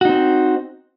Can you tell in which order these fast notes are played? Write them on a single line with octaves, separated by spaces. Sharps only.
F#4 D#4 C4